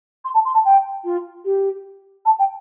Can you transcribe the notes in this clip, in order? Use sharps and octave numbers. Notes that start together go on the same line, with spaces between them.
C6
A5
C6
A5
G5
F4
G4
A5
G5